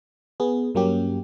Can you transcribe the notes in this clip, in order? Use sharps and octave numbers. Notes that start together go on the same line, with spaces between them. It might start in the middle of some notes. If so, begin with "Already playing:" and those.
B3 G#4
G2 F#3 A#3 C#4 G4